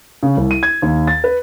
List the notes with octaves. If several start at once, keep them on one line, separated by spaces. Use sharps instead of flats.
C#3
C2
D#7
G#6
D#2
A6
B4